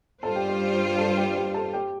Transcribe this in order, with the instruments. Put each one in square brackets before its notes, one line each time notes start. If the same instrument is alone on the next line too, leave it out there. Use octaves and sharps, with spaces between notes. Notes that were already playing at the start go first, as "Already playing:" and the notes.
[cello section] G2 G3 F4 C5 [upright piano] A4 A5
[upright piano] G4 G5
G4 G5
G4 G5
A4 A5
G4 G5
G4 G5
A4 A5
G4 G5